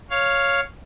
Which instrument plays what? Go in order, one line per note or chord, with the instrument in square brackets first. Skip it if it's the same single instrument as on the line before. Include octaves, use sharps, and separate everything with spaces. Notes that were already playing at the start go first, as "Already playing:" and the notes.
[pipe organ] C#5 F5